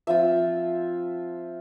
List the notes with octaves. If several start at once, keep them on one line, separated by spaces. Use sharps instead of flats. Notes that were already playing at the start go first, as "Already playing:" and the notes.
F3 C4 F4 E5